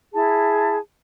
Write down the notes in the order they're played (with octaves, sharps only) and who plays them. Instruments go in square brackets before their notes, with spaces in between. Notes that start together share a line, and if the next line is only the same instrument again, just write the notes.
[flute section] E4 G#4 A5